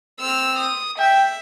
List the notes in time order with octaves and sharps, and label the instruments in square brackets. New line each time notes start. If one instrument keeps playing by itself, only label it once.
[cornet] C4 [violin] E6 F6
[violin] D#6
[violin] E5 [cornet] G5